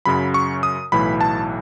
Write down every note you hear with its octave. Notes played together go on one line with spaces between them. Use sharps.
F#2 C#3 F#3 B5
C#6
D#6
B1 A2 E3 B5
A5